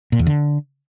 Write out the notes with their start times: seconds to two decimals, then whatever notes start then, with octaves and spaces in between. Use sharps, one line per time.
0.12 A#2
0.19 E2
0.27 D3